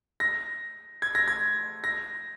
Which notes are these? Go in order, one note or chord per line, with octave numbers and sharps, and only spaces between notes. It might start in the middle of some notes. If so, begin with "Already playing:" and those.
A#6
G#6
A#6
G#6
A#6